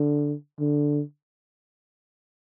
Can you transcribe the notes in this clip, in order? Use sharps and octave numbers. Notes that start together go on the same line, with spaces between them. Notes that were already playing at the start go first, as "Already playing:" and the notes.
Already playing: D3
D3